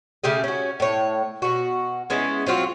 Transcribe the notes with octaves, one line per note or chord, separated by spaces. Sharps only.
C#3 A3 G4 G#4
C#4 F#4
A2 C#5
B2 F#4
G#3 B3 C#4 E4
F#3 C4 F4 F#4